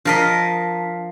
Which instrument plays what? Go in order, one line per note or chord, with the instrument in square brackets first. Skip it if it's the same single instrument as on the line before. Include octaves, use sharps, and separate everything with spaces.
[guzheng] F3 A#4 D#5 [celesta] D4 A5 B6